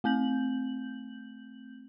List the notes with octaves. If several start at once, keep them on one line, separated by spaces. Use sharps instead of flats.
A3 C4 G6 F#7